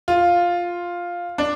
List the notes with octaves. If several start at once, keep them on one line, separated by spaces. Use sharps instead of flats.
F4
D4